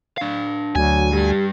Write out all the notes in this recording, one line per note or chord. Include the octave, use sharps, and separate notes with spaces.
D4 F5
D2 F#3 G#5
G2 G3 G4